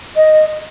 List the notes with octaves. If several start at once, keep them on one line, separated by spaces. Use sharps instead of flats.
D#5